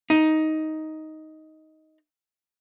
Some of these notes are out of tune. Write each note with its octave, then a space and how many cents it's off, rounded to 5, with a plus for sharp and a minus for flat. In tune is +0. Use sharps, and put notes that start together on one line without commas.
D#4 +10